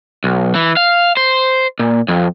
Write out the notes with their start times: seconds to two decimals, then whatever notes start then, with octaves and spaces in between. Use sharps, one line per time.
0.24 B1
0.55 E3
0.77 F5
1.17 C5
1.79 A#2
2.08 F2